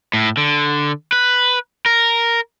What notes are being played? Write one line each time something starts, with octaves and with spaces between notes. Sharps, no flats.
A2
D3
B4
A#4